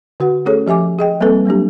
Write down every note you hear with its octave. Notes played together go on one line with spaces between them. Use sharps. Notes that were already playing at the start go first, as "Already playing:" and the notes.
D3 F#4 B4 F#5
A3 C#4 G#4 A4 C#5
F3 G4 E5 G#5 D6
G#4 D#5 G5
G3 A#3 C4 A4 B4
F#3 A#3 D4 G4